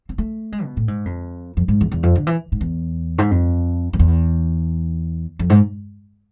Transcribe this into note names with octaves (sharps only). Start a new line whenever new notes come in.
C4
A3
G#3
B2
A2
G#2
F2
F2
G#2
E2
E2
F2
D3
E3
G#2
E2
G#2
F2
F2
E2
F2
G#2